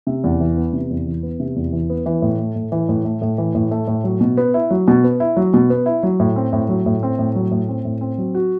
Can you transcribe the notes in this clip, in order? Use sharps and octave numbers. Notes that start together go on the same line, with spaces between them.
C3
E2
E3
B3
C3
E2
E3
B3
C3
E2
E3
B3
E3
A2
A3
A2
E3
A2
A3
A2
E3
A2
A3
A2
F#3
B2
B3
E4
F#3
B2
B3
E4
F#3
B2
B3
E4
F#3
A2
C4
A2
F#3
A2
C4
A2
F#3
A2
C4
A2
C4
F#3
F#4